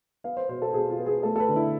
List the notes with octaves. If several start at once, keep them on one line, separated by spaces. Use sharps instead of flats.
B3 F5
C5
B2 C5
A4
B2 G#4
F4
B3
G#4
A3 A4
A4
B4
D3
E4